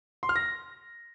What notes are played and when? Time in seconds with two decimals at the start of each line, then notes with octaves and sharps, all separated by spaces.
0.23 C6
0.29 F6
0.36 A#6